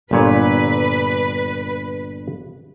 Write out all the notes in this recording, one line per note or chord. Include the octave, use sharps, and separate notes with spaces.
G1 A#2 B4 C#5